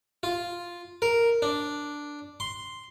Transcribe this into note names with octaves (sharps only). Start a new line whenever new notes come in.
F4
A#4
D4
C6